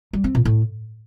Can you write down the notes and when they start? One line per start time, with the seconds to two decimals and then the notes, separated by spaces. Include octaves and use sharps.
0.13 G3
0.24 C4
0.35 A#2
0.45 A2